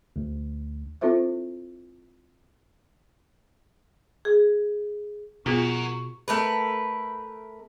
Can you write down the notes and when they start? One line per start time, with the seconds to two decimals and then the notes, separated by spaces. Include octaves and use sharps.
0.16 D2
1.01 C4 E4 F4 A4 C5 E5
4.25 G#4
5.46 B2 B3 F4 F#4 G#4 A#4 C#6
6.28 A3 A#4 B4